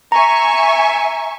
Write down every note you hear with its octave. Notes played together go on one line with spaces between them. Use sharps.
E5 G#5 A#5 C#6